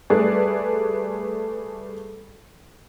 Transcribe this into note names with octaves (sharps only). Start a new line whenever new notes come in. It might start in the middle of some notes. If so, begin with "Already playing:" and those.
G3 A3 G#4 B4 D5